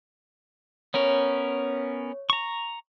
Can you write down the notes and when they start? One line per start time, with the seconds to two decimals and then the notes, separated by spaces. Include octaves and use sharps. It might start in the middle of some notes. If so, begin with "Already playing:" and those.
0.94 B3 C#4 A#4 C#5
2.30 A#5 C#6